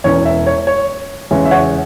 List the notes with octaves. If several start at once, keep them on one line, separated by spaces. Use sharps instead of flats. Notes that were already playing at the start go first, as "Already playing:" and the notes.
E1 E2 E3 C#4 C#5
E5
C#5
C#5
E2 C#3 G#3 C#4 E5
E5
C#5 F#5